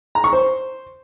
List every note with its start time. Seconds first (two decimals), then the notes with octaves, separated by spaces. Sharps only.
0.15 A#5
0.24 C#6
0.33 C5